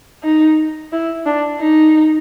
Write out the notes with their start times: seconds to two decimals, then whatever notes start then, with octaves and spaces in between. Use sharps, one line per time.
0.24 D#4
0.92 E4
1.26 D4
1.60 D#4